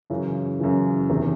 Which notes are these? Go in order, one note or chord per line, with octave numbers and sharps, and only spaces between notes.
F#2 C#3 E3
F#2 C#3 E3
E2 C3 D#3